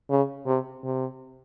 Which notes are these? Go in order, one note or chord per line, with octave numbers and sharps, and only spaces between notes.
C#3
C3
C3